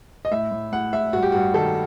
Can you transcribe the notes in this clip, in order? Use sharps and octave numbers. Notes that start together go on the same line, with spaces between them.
D#5
A2 E5
A2
A2 F#5
A2 E5
G2 F#4
G4
G2 F#4
D#3 A4